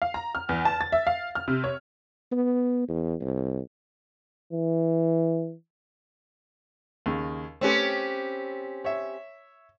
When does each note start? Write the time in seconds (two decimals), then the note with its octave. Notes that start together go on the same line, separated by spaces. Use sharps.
0.02 F5
0.14 A#5
0.35 F6
0.49 E2
0.65 A5
0.81 A6
0.92 E5
1.07 F5
1.35 F6
1.48 C3
1.64 C#5
2.32 B3
2.88 E2
3.21 C2
4.53 E3
7.06 D#2 C#3
7.61 A3 C4 C#4 G4 B4
8.84 C#5 E5